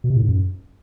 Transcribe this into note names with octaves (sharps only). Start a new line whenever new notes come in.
B2
C3
A2
G#2
F#2